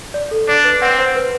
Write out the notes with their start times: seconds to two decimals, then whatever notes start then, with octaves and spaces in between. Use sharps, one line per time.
0.14 D5
0.31 A4
0.48 D4 D5
0.64 B4
0.82 C4 F#5
0.98 C5
1.16 B4